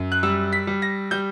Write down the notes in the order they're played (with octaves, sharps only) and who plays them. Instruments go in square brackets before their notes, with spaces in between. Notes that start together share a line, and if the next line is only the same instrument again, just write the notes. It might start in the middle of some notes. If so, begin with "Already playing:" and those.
Already playing: [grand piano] F#2
F#6
G3 E6
B6
G3
A#6
G3 G6